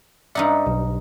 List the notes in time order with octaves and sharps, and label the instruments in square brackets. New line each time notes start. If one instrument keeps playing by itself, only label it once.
[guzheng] G2 D#4 F#5 [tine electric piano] D5 E5
[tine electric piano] B1